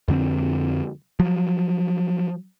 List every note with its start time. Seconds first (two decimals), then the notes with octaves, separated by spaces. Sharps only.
0.08 F2 D3 B3 C4
1.20 F3 F#3